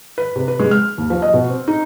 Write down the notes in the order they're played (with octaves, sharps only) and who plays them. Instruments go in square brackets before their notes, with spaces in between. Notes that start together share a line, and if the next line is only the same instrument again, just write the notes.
[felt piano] B4
C3
B4
G#3
F6
D#2
F3
D#5
B2
C4
D#4